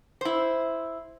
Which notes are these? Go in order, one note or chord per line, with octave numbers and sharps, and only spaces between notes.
E4 C5